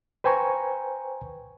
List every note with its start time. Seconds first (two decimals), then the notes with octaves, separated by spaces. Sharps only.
0.24 B4 C5 G5 G#5 A#5 C#6